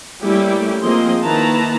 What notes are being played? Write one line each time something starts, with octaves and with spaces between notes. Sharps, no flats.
G3 A3 A#3 C#4 E4 G4
F3 A#3 C4 G#4 D#5 C6
D#3 A#3 E4 B4 A5 A#5